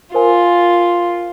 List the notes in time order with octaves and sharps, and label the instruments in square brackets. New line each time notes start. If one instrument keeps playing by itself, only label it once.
[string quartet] F4 [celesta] A#4 C5 G#5